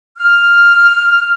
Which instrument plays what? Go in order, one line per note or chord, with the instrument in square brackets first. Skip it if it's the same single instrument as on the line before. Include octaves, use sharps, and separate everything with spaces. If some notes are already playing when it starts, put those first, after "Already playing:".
[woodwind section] F6